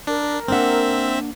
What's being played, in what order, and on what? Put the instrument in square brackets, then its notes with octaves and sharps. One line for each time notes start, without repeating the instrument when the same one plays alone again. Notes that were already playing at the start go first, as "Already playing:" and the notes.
[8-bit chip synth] D4 [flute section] A#4
[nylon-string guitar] A#3 D4 F#5 [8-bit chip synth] C4 E5